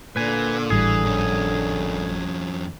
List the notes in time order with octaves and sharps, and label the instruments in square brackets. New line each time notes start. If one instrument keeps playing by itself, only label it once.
[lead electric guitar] A#2 [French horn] D3 [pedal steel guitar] B4 G#5
[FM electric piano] G#1 A2 G3 [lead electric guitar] E3 [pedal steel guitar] G#4
[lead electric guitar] F2 C#4